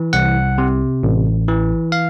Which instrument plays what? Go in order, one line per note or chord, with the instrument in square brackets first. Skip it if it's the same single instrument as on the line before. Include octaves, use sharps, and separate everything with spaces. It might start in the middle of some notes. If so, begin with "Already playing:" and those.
Already playing: [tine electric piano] E3
C2 F#5
C3
A1
E3
F5